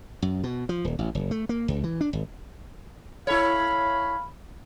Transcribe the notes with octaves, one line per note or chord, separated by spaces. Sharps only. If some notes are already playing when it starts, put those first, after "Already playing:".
F#2
B2
F3
D#1
A1
F#1
A3
A#3
C#2
E3
D4
G#1
E4 A4 C#5 F5 B5